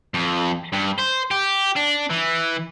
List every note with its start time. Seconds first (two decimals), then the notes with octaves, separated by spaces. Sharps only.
0.14 F2
0.73 G2
0.98 C5
1.31 G4
1.76 D4
2.10 E3